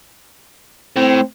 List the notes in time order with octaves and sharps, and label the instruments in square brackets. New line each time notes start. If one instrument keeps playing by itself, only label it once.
[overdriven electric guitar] A2 [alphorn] C4